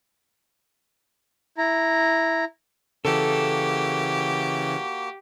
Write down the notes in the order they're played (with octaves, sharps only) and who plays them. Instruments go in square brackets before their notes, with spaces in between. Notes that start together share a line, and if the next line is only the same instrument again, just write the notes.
[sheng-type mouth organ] E4 A#5
[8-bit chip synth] C#3 E3 [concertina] A#3 F#4 [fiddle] G4 [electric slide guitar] A4